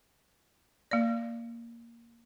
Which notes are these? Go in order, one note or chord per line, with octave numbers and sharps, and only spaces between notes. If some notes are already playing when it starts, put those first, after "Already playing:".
A#3 D5